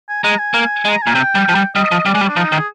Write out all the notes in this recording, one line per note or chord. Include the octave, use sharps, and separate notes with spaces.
G#5
G#3 A#5
G#5
A#3
G#3 A#5
A#2 G#5
C3 G5
G3
F3
G3
G3 D#5
F3
G3 D5
G#3
G3
D4
F3 D#4
D#3
G#4